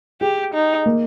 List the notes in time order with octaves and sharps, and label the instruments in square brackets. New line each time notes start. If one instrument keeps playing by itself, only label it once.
[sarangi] G4 [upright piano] G#4
[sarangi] D#4
[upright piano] A#3